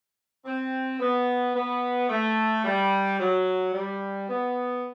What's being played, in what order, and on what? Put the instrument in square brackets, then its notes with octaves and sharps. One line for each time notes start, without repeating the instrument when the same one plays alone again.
[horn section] C4
B3
B3
A3
G3
F#3
G3
B3